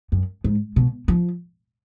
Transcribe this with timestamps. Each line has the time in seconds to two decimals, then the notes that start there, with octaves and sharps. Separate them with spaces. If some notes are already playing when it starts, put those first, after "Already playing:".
0.12 F#2
0.44 G#2
0.76 B2
1.08 F3